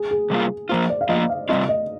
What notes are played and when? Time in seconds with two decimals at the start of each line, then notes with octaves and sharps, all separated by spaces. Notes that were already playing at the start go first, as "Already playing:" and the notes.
Already playing: G#4
0.11 G#4
0.30 C3 G3 A#3 F4
0.69 F3 A#3 F4 C5
0.90 D5
1.01 F5
1.09 F3 A#3 F4 D#5
1.29 F5
1.49 C3 G3 C4 F4 D#5
1.69 D#5